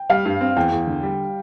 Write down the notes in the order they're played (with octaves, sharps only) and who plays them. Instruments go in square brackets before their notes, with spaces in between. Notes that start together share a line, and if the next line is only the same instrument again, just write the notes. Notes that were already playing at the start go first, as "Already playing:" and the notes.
Already playing: [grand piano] G5
[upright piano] G3 [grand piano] F5
[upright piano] G2
C4
[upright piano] E2 [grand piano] G5
[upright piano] E2
D3
G3